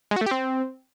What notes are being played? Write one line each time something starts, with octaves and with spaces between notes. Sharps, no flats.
G#3
F#4
A3
G4
C4